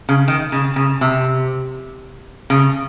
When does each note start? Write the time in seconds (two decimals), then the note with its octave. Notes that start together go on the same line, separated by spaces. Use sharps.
0.09 C#3
0.28 D#3
0.52 C#3
0.76 C#3
1.01 C3
2.50 C#3